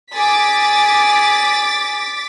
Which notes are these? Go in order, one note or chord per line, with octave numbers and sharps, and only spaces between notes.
G#4 D6 A6 B6